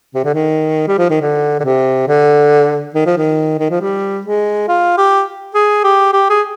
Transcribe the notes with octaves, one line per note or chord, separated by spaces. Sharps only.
C3
D3
D#3
G3
F3
D#3
D3
D3
C3
D3
D#3
F3
D#3
D#3
F3
G3
G#3
F4
G4
G#4
G4
G4
G#4